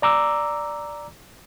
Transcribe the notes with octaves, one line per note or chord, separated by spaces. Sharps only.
D5 A#5 D6 E6